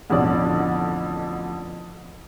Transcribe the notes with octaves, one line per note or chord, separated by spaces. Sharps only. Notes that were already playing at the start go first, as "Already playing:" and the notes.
A1 F2 B2 D3 D5